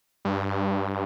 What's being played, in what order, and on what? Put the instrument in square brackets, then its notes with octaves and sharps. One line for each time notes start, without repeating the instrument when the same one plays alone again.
[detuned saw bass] G2